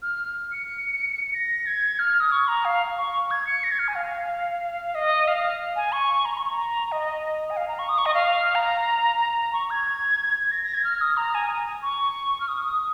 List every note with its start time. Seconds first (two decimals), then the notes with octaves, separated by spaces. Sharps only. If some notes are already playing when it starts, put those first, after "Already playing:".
0.02 F6
0.52 C#7
1.34 A#6
1.66 G#6
1.99 F6
2.20 D#6
2.32 C#6
2.48 A#5
2.65 F5
2.97 C#6
3.31 G#6
3.47 C#7
3.64 A#6
3.71 G#6
3.79 F6
3.88 G#5
3.95 F5
4.95 D#5
5.28 F5
5.76 G#5
5.92 C#6
6.25 A#5
6.38 C#6
6.49 A#5
6.92 D#5
7.50 G#5
7.57 F5
7.68 A#5
7.79 C#6
7.89 D#6
7.98 C#6
8.06 D#5
8.14 F5
8.55 A#5
9.53 C#6
9.70 G#6
10.51 A#6
10.63 A#6
10.74 G#6
10.84 F6
11.01 D#6
11.17 A#5
11.35 G#5
11.83 C#6
12.40 F6
12.48 D#6
12.65 D#6